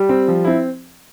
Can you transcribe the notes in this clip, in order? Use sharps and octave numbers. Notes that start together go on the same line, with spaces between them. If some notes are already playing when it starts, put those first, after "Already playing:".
Already playing: G3 G4
C4
F3
C4 E4